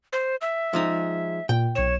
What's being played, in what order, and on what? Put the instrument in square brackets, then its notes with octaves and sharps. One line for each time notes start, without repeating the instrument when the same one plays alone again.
[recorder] C5
E5
[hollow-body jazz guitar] F3 G#3 D#4
[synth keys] A#2 [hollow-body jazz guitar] G5
[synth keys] B1 E7 [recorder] C#5